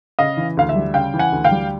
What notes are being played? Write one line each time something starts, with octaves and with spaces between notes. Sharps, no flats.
C#3 D#5 F5
E3
D2 F5
E5
G3
C#3 F5 G5
E3
F#5 G#5
D2
F5 G5
G3